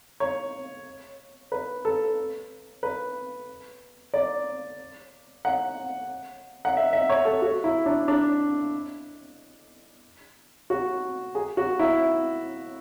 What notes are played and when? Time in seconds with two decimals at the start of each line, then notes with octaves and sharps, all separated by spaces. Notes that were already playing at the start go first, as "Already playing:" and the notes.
0.20 C#5
1.52 B4
1.85 A4
2.83 B4
4.14 D5
5.45 F#5
6.65 F#5
6.77 E5
6.93 E5
7.10 C#5
7.25 A4
7.42 F#4
7.64 E4
7.86 D4
8.08 D4
10.70 F#4
11.35 G#4
11.57 F#4
11.79 E4